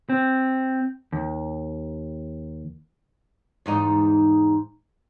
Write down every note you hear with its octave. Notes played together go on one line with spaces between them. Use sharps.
C4
D#2
E2 G#2 D#4